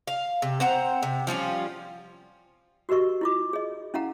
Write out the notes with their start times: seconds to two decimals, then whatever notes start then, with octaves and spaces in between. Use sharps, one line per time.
0.07 F5
0.42 C3
0.60 C4 C5 F#5 A#5
1.03 C3
1.27 F3 G3 C#4 F4
2.89 F#4 G4 A#4 D#5 C#6
3.21 E4 F4 D6
3.53 G#4 D#5
3.94 C#4 E4 F5 F#5 A#5